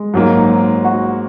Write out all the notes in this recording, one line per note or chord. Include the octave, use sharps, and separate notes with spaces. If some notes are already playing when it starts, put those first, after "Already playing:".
Already playing: G#3
G#2 F#3 A#3
F#4 F#5